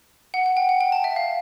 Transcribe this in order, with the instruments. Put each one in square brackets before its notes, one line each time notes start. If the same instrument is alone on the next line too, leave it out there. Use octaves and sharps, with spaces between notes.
[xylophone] F#5
F#5
G5
F#5
G5
A5
E5
F5